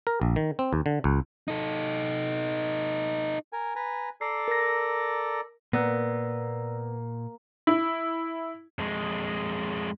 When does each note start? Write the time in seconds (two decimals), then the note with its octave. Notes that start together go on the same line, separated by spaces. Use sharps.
0.07 A#4
0.21 A#1
0.36 D#3
0.59 C4
0.73 D#2
0.86 D3
1.04 C#2
1.48 D#4 A4
3.53 A#4 G#5
3.76 B4 G#5 A#5
4.21 A4 D5 A#5 C7
4.48 A#4 A#6
5.73 A#2 A#3 B3 D5 E6 A#6
7.67 E4
8.79 F2 G#3